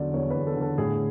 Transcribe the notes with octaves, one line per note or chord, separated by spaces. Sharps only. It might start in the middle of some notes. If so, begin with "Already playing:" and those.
Already playing: E2 D3 F#3 D5
E2 C#5
E2 B4
A4
D3
A4
A2 G#4